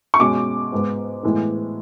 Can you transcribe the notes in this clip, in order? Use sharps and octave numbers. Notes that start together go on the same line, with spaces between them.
C#6
B2 G#3 C#4 D6
G#2 G#3 B3
A2 E3 G#3 B3